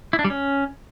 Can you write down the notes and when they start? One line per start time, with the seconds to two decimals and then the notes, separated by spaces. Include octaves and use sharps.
0.13 E4
0.19 D4
0.25 G3
0.30 C#4